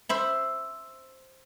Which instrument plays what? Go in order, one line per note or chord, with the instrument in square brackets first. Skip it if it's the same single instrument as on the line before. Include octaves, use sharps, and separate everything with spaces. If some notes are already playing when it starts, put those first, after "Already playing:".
[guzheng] C5 E5 B5